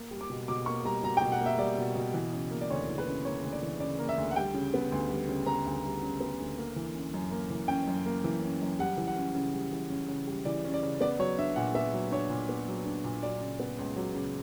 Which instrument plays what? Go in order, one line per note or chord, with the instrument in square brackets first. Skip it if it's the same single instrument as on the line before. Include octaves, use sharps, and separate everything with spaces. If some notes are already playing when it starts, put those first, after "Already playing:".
Already playing: [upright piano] A#3
G3
D6
B2
B2 D6
A#3 C#6
G3 A#5
B2 A#5
G5
B2
F#5
A#3
E5
G3 D5
B2
B2
E3
C#3
A#3
D5
D2 C#5
E3
B4
C#3
A#3 C#5
D2
D5
E3
C#3 D5
A#3
E5
D2
F#5
G3 G5
C#3
B3
D2
G3
C#3
B3 A#5
D2
G3
C#3
B3
D2
A#3
E3
C#4
F#2
A#3
E3
C#4 G5
F#2
A#3
E3
C#4
F#2
G3 F#5
E3
F#5
C#4
C#3
G3
E3
C#4
C#3
G3
E3 D5
C#4
D5
C#3
B3 D5
F#3 C#5
D4 E5
A#2 F#5
B3 E5
F#3
D4 C#5
A#2
B3
F#3
D4
A#2
F#3 D5
C#3
B3
C#2
F#3
C#3